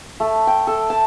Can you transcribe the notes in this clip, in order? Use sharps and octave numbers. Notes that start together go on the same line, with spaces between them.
A3
G5
A4
A5